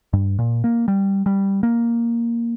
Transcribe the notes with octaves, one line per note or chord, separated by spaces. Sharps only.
G2
A#2
A#3
G3
G3
A#3